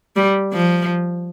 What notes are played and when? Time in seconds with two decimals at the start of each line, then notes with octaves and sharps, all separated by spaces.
0.16 G3
0.53 F3